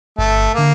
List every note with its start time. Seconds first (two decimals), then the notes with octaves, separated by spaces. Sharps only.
0.18 G1 A3
0.54 D3 A#3